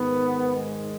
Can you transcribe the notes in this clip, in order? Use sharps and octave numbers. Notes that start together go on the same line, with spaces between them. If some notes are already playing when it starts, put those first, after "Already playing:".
Already playing: G#2 D#3 B3
G#3